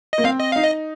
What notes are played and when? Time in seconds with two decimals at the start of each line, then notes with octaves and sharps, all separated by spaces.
0.13 D#5
0.18 A#3
0.24 C4 F5
0.40 D#5
0.52 D#4 F5
0.64 D#5